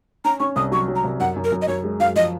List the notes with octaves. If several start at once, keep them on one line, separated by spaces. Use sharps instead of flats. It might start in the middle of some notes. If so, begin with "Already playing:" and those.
C#4 A#5
C#4 C#6
C2 D#6
F#3 C#6
F#3
A#5
C2
F#2 F#5
F#2
A#4
F#2
D#5
F#2 C#5
G#3
F#2 F5
F3 D#5